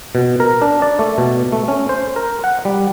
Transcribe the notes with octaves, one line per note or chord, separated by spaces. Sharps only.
B2
A#4
D4
D5
A3
B2
A3
C#4
C5
A#4
F#5
G3